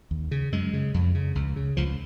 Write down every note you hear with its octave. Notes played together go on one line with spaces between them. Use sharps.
D#2
C#3
F#2 G#3
C#3
F2
C#3
C#2
C#3
C#2 F3